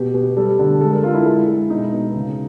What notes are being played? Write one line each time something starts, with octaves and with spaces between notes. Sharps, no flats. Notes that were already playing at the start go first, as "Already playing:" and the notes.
Already playing: B2 G4
B2
G3 A4
D3
G#3 A4
A#4
G#3 F4
E4
G#3
G#3
B2 D#4
B2
C#3